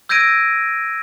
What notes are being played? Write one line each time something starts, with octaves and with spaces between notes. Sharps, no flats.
E6 G6 G#6 A#6 D7 D#7